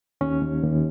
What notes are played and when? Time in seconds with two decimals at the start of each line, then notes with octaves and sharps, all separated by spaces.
0.21 D#2 C#4
0.42 D#2
0.63 D#2